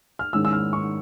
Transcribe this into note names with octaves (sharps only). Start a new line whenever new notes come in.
F6
G#2 D#3 G#3 C#4 E4 E6
E6
F6
C#6